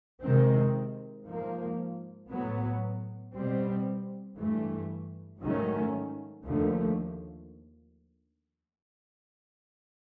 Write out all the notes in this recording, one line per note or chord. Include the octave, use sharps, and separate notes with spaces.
C3 D#3 G#3 C4
G#2 F3 A#3
A2 F#3 B3
B2 G3 C4
G2 E3 A3
G#2 D#3 F#3 A3 C#4
D#2 D3 F3 A3